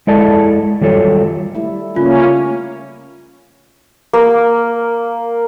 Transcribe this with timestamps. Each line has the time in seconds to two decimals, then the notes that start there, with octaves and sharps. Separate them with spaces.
0.07 G#3 E4 A4 D5 A5
0.81 D#3 F#3 G3 F4 A4 C#5
1.55 G3 A3 E4
1.96 C#3 A3 A#3 C#4 F4
4.13 A#3